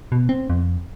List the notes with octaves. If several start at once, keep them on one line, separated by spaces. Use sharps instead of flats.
B2
C4
F2